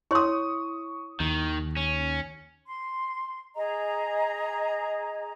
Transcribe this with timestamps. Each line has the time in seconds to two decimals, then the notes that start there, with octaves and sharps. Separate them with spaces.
0.11 E4 C#5 C6 C#6 D#6
1.20 D#2 D#3
1.77 C#4
2.65 C6
3.56 G#4 D#5 A#5